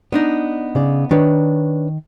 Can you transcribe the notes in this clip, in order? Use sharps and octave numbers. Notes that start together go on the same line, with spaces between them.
B3 D4 D#4 D5
C#3 D5
D#3 D4 B4 C#5